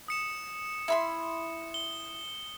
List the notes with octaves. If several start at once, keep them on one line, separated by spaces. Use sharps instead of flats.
D#6 C#7 E7
E4 B5 C6
G7